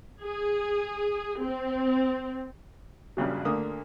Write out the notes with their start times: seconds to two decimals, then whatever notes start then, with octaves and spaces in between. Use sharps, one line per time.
0.20 G#4
1.41 C4
3.17 A#1 G2 C#3 F#3
3.45 D2 D3 A#3 D#6